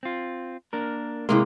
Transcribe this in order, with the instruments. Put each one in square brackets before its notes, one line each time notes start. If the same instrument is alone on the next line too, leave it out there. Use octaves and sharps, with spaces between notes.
[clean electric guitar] C4 F4
A#3 D4 A#4
[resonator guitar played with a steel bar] A2 C3 A#3 [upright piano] G#3 E4 [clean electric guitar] C6